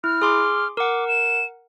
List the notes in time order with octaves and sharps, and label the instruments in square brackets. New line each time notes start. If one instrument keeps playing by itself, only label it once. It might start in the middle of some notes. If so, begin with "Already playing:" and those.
[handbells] E4 [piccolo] F6
[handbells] G#4 C6 D6
[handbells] A#4 F#5 [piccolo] D6
[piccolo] E7